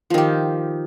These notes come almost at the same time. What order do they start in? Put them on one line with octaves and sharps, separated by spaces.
F3 D#3 G4